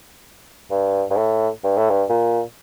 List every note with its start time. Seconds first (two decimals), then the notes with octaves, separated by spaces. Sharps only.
0.71 G2
1.10 G2
1.16 A2
1.64 G2
1.77 A2
1.90 G2
2.09 A#2